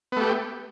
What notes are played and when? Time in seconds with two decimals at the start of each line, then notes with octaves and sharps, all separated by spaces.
0.12 B3
0.17 A3
0.21 G4